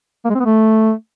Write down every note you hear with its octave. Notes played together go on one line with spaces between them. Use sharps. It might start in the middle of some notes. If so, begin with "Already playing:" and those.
A#3
G#3
C4
B3
A3